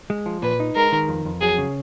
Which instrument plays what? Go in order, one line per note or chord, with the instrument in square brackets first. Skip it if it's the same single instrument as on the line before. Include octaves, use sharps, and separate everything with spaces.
[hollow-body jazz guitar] G#3
F3
[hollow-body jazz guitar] A#2 [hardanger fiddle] B4
[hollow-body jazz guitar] D#4
[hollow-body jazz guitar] G#3 [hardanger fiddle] A#4
[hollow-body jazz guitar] D#3
F2
F2
[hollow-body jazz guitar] F#3 [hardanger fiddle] G#4
[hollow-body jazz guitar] C#3